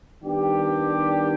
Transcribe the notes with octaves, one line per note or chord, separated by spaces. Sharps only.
D#3 G3 B3 D4 G4